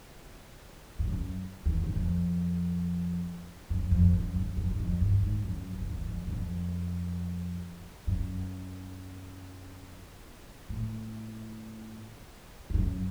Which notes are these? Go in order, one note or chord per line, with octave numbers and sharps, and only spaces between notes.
F2
F#2
E2
F#2
F2
F#2
F2
F#2
F#2
F2
F#2
F2
G2
G#2
F#2
E2
F2
E2
F2
F#2
F2
F#2
A2
F2
F#2